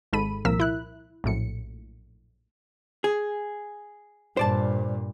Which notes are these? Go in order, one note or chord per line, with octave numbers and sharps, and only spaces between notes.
G#1 G#2 A4 B5 D#7
C2 A#2 F3 A#4 E6 B6
E4 F#6
A#1 F#2 A2 C#7
G#4
G2 A#2 C5 D5 A5